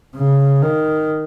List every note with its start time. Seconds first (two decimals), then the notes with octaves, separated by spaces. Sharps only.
0.17 C#3
0.62 D#3